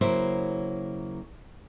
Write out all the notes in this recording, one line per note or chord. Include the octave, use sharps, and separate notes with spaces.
C#3 F#3 A#3 E4 B4 C5